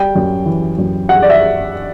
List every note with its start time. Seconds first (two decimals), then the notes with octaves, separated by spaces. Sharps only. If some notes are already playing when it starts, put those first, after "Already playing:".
Already playing: G3 G5
0.15 F#2
0.46 E3
0.78 F#2
1.09 G3 F#5
1.22 D5
1.30 E5